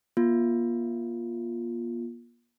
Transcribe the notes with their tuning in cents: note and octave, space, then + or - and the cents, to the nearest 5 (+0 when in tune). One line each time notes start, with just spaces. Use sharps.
A#3 +45 F4 +0